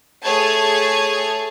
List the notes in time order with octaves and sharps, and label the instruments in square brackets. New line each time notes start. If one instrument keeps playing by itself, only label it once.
[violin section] A3 G#4 C#5 G#5 A5 G#6